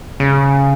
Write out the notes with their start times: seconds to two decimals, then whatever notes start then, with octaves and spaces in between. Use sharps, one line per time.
0.20 C#3